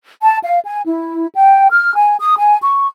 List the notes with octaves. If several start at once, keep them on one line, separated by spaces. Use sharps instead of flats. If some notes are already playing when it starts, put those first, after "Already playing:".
A5
F5
G#5
E4
G5
F6
G#5
D#6
G#5
C#6